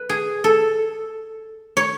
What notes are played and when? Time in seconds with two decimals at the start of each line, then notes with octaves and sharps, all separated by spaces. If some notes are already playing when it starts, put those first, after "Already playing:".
Already playing: B4
0.09 G#4
0.44 A4
1.77 C#5